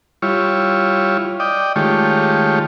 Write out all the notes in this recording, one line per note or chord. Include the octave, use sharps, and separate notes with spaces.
G3 E4 F4 C#5
D5 D#5 G5
D#3 G#3 A3 F4 G4 C#5